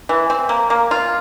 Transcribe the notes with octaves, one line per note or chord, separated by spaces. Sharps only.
E3
C4
A#3
A#3
F4